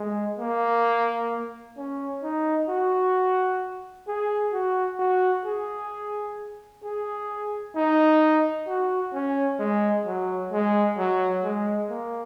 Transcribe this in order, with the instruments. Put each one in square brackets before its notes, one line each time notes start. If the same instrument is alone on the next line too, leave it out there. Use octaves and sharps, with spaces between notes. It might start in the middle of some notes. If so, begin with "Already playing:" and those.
Already playing: [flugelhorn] G#3
A#3
C#4
D#4
F#4
G#4
F#4
F#4
G#4
G#4
D#4
F#4
C#4
G#3
F#3
G#3
F#3
G#3
A#3